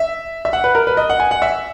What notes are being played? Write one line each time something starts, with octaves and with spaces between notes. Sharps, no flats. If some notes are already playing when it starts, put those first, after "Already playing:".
Already playing: E5
E5
F#5
B4
A#4
B4
D#5
F#5
G#5
F#5
E5